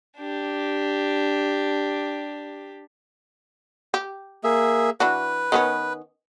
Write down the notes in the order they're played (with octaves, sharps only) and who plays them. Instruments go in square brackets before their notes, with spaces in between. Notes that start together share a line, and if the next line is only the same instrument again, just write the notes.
[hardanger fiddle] D4 G4
[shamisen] G4
[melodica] A#3 G#4 E5
[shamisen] E3 D4 F#4 [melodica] B4
[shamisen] D#3 B3 C#4